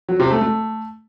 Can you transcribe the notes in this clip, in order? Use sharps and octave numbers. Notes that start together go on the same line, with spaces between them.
F#3
C3
A3
A3